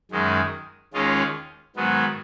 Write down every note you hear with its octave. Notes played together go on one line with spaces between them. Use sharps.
F#2 D#3 G#3
D#2 D#3 G#3 C#4 F4
G#2 D#3 F#3 B3